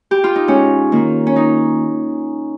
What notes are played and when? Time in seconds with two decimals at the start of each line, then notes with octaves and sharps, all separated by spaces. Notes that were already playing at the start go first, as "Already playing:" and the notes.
0.11 G4
0.24 F4
0.35 D#4
0.47 G#2 C#4
0.92 D#3 A#3
1.27 C#4
1.36 D#4